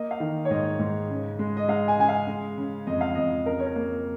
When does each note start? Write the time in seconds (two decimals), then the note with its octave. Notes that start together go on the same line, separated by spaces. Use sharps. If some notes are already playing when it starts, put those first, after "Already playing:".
Already playing: A#3 D#5
0.11 F5
0.20 D#3
0.45 C#5
0.51 G#2 D#5
0.79 G#2
1.09 C#3
1.39 G#3
1.57 D#5
1.68 G#3 F5
1.88 G#5
1.98 C#3 G#5
2.09 F5
2.27 G#3
2.57 C#3
2.87 F2 D#5
3.01 F5
3.15 F2 D#5
3.46 C#3 A#4
3.60 C#5
3.66 A#4
3.76 A#3